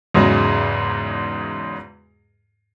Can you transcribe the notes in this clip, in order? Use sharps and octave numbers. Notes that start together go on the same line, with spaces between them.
E2 G#2 C#3 F#3 G#3